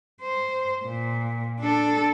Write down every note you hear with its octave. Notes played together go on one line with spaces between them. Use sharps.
C5
A#2
D4 A4